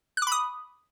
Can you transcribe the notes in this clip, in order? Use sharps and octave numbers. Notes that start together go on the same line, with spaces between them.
B5 D6 D#6 F#6